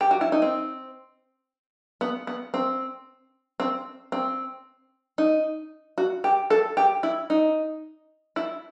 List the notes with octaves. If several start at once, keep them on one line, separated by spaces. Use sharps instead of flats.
G4
F#4
E4
D#4
C4
B3
B3
C4
C4
C4
D#4
F#4
G4
A4
G4
E4
D#4
E4